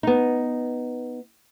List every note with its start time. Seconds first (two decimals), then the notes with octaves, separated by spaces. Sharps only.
0.03 B3 D#4